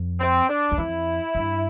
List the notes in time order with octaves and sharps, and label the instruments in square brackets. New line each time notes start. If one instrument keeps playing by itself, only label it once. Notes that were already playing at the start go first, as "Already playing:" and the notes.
Already playing: [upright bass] F2
[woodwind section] C4
D4
[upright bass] E2
[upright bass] F2 [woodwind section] E4
[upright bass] G2